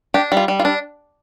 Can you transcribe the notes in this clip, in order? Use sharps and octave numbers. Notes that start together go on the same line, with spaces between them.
D4 G4
G3
F4
G3
F4
D4